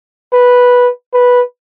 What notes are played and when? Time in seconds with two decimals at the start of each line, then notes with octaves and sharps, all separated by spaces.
0.34 B4
1.14 B4